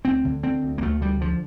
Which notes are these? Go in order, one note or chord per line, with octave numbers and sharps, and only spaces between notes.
D2 C4
D3
D3 C4
D2
A#3
D2 A3
D3 G3
D3 F3